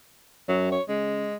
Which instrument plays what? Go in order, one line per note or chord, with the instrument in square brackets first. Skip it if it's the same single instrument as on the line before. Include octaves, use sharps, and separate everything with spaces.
[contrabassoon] F#2 [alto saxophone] F#3
[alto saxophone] C#5
[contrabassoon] C#3 [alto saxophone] G#3